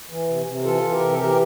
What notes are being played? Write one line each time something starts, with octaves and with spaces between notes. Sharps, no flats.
E3
C3
C3
E3 F4 A4
E3
G4 A#4
C3
A4
E3 G4 A#4